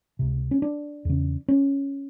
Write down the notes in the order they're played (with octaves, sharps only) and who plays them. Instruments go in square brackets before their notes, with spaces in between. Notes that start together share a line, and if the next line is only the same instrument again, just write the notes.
[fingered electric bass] C#2 C3
C#4
D4
E2 C#3
C#4